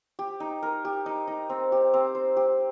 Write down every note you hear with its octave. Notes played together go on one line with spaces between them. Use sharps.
G4
D#4
A#4
G4
D#4
D#4
C4
G4
C4
C5
G4